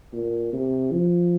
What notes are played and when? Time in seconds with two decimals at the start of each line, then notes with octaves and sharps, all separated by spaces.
0.13 A#2
0.53 C3
0.92 F3